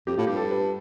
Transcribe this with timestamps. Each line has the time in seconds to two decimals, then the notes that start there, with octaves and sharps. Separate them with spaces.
0.07 F2 G4
0.17 A2 F4
0.27 G2 G4
0.36 A4
0.51 B4